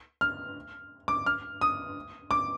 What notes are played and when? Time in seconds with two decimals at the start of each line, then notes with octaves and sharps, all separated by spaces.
0.21 F6
1.08 D6
1.26 F6
1.61 D#6
2.31 D6